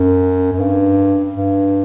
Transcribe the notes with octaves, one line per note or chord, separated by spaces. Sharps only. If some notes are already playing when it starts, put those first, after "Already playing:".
Already playing: F#2
F#2
G2
G2